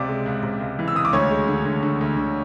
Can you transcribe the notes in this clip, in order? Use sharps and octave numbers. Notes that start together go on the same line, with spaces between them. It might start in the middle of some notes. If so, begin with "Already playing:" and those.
Already playing: C#2 C3 D5 D6
G#3
C#2
C3
C#2
E3
E6
C#2 D#6
D6
D2 C#5 C#6
G#3
D3
D2
D3
D2
D3